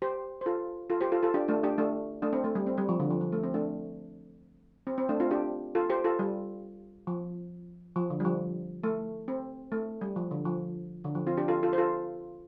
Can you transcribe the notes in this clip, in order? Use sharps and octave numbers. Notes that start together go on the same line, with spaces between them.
G4 C5
C5
F4 A4
F4 A4
G4 C5
F4 A4
F4 A4
D4 G4
A3 D4
D4 G4
A3 D4
A3 D4
C4
A3
G3
C4
G3
F3
D3
F3
F3
A3
C4
A3 D4
C4
C4
A3 D4
C4 F4
D4 G4
F4 A4
G4 C5
F4 A4
G3
F3
F3
D3
G3
F3
A3
C4
A3
G3
F3
D3
F3
D3
F3
C4 F4
D4 G4
F4 A4
F4 A4
C5
F4 A4